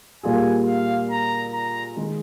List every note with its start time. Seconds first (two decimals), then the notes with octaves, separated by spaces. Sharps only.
0.23 A#2 G3 A#3 F4 G#4 G#5
0.67 F5
1.11 A#5
1.53 A#5
1.96 D#3 G#3 D#4